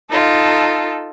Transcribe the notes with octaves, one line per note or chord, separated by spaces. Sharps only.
D#4 F4 A4